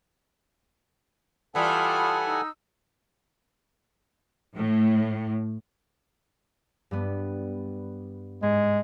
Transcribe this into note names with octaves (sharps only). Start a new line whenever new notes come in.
E3 G3 F4 A4 F#5 G#5 A5 D#6
D#4 E6
A2
G2 G3 B3
G#2 G#3